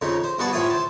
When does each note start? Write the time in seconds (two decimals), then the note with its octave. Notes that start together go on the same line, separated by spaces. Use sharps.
0.02 F2 C#3 C#4 D#4
0.24 C5
0.38 G2 B3 F#4 G#4 A5 C#6
0.53 A2 F3 A3 G#4 C#5 D#6
0.70 C5 A5